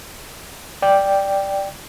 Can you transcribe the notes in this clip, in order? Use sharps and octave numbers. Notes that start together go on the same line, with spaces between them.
D5 G5